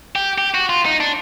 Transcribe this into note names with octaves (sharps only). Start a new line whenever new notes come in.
G4
G4
F#4
F4
D#4
D4